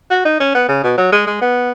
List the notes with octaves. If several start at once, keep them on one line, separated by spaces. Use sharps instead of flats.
F#4
D#4
C#4
B3
C#3
B2
F#3
G#3
G#3
B3